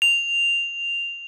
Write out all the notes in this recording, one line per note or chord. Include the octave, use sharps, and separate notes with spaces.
F7